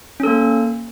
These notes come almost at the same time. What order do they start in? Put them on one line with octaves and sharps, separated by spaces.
C#4 A4 A#3